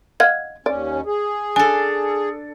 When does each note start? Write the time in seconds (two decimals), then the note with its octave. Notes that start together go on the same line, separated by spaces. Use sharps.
0.20 D#5 F5 F#5 G#6
0.66 D#2 C#4 D5
1.06 G#4
1.56 D4 A4 G#5